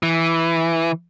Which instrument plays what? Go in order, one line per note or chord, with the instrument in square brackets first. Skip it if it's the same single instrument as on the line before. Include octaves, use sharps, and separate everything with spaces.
[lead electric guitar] E3